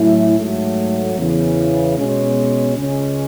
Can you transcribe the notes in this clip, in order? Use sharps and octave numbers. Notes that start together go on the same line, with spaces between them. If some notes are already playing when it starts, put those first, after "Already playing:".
Already playing: A2 F#3 A3 C#4 E4
G#2 F#3 A3
E2 C#3 E3
B2 G#3 C#4
C#2 C#3 G#3 C#4